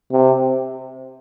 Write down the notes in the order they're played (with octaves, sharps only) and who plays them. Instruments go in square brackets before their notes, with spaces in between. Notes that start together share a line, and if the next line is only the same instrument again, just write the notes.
[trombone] C3